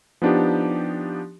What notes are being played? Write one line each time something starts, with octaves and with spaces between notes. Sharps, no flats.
F3 B3 D4 D#4 G4